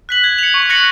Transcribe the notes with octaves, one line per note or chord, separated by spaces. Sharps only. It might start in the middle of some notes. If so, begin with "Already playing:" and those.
F#6 B6 F#7
G#6
C#7 F7
C#6
F#6 A#6 C#7 F#7